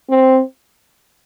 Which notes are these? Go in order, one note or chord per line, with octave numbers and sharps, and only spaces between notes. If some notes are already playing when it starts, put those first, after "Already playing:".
C4